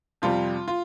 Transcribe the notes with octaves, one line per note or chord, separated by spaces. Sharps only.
F2 C3 G3 C4 F4
F4